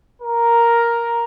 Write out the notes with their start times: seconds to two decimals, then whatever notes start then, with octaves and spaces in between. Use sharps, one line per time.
0.21 A#4